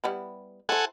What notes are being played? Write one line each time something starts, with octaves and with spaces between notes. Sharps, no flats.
G3 B3 E4
E4 A4 C5 F#5 G#5